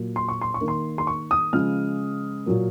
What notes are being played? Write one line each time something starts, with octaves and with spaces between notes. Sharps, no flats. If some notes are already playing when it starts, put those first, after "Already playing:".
Already playing: A#2 F#3 A#3
C6
C#6
C6
C#6
D#3 A#3
C6
C6
C#6
D#6
C#3 F3 G#3 F6
A#2 F#3 A#3